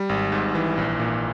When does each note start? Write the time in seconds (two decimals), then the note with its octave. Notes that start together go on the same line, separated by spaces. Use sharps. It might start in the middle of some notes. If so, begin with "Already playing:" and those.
Already playing: G3
0.09 G#1
0.32 G#2
0.55 E3
0.78 A#1
1.00 A#2